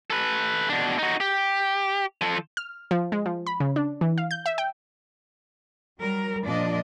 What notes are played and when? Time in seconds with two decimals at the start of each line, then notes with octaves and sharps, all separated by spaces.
0.10 A4 B4
0.69 B2 D4
0.99 D#4 F#4
1.20 G4
2.21 F3 A4
2.57 F6
2.91 F3
3.12 G#3
3.26 F3
3.47 B5
3.60 C#3
3.76 D4
4.01 E3
4.18 F5
4.31 G6
4.46 E5
4.58 G5
5.99 F#3 G3 A#4
6.45 A#2 F3 D4 D5 D#5